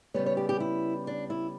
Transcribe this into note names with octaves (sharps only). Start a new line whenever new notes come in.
C#3 G3 B3 C#5
C#5
G4
G4
E4
D4
E4